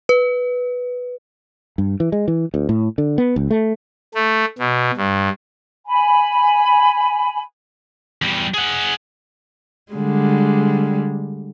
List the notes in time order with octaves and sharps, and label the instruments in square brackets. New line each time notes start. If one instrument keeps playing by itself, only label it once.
[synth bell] B4
[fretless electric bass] G2
E3
G#3
E3
D2
A2
D3
B3
C#2
A3
[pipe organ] A3
B2
G2
[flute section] G#5 B5
[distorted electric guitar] E2 G3
G#4 F#5
[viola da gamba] D3 G3 G#3